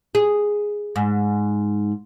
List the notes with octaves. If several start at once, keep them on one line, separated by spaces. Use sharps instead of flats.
G#4
G#2